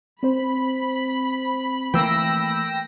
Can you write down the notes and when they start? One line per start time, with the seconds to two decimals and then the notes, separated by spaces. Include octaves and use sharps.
0.23 C4 C5 B5
1.94 E3 A3 A#3 G5 E6 A#6